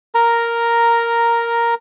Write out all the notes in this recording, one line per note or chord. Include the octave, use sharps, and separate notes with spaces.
A#4 A#5